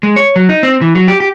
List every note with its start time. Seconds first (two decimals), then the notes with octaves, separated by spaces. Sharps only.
0.03 G#3
0.16 C#5
0.36 F#3
0.49 D#4
0.63 C4
0.81 E3
0.95 F#3
1.08 G4
1.20 G4